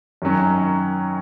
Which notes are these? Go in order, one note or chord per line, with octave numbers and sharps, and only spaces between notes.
F#2 D#3 F#3 C#4